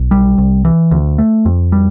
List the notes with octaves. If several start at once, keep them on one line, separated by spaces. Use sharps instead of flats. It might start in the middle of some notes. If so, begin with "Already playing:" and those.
Already playing: B1
G3
C2
E3
D2
A3
F2
G3